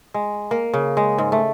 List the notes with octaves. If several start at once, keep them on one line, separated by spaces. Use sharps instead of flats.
G#3
A#3
C#3
G#3
G#2
A3